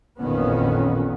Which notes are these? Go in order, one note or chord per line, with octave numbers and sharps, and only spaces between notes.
A1 F2 A#2 D#3 B3 C#4